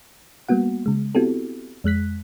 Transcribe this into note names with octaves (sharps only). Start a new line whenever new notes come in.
G3 A#3 B3 F#4 F#5
C#3 G#3
B3 C4 E4 F#4 G4 A4
F2 G#3 F#6 B6